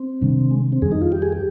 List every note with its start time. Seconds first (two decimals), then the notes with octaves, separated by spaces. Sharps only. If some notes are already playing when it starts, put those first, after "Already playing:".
Already playing: C4
0.21 C3 D#3 G3 D4
0.51 G#3
0.72 C4
0.82 F2 D#3 G3 G#4
0.92 D#4
1.02 F4
1.12 G4
1.22 G#4
1.32 G4